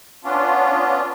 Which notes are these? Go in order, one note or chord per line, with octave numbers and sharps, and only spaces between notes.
B3 C#4 D4 F4